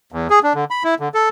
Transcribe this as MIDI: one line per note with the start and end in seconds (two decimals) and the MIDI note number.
0.12 0.27 40
0.30 0.39 68
0.43 0.53 62
0.55 0.64 50
0.71 0.83 83
0.84 0.95 64
1.00 1.09 50
1.14 1.29 69